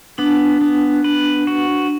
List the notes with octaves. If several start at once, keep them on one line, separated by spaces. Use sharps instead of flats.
B3 D4
B3
B4
F#4